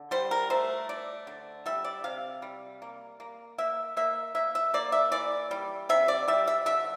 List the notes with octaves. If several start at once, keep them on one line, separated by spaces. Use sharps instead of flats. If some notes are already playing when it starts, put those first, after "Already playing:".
Already playing: D3
G3 C5
A#4
A3 C5
A3 D5
D3
G3 E5
D5
C3 F5
G3
A#3
A#3
A#3 E5
A#3 E5
A#3 E5
E5
A#3 D5
E5
E3 D5
G3
C3 E5
D5
G3 E5
E5
D3 E5